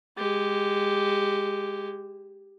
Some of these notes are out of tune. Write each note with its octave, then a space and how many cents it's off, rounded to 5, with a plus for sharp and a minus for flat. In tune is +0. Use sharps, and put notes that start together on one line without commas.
G#3 -15 G4 +0